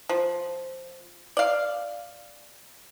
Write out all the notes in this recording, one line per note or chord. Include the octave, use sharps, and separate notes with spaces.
F3
D5 F5